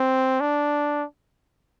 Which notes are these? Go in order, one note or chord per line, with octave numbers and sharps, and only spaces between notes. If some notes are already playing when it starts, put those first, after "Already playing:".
Already playing: C4
D4